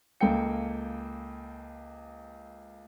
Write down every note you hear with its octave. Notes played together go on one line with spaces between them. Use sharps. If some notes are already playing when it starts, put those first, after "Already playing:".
C#2 A#3 A4 G5 C#7